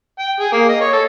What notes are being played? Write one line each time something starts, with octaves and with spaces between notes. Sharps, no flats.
G5
G#4
A#3
D#5
C#5
A4